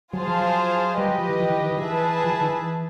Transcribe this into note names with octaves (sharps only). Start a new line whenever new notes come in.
F#3 F4 G#4 C5 F5 A5
F3
F#3
G3 G4 B4 D#5
F#3
F3
E3
F3
E3
D#3
D#3
F3
E3 G#4 B4 E5 A5
F3
E3
D#3
E3